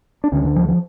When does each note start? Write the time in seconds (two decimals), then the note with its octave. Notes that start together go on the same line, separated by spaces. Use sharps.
0.24 D4
0.32 D2 D3 C#4
0.45 D3
0.56 F3
0.68 F3